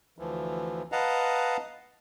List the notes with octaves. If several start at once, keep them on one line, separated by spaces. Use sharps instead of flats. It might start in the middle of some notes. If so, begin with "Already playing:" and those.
D2 E3 F3
B4 D#5 F5 F#5 A5 A#5